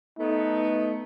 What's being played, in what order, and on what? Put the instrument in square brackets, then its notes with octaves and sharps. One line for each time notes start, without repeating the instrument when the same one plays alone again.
[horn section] A3 B3 [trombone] D#4